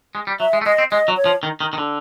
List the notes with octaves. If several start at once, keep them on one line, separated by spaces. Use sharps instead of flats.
G#3
G3
F#3 E5
G#3
A3
G#3 D#5
C4
G#3 D#5
F#3
C#5
F3
D#3
D#3
D#3
D3